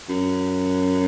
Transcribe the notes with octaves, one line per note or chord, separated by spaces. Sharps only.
F#2